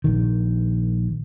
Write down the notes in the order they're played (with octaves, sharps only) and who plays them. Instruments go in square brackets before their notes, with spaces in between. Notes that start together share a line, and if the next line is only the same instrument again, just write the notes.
[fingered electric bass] A#1 D#3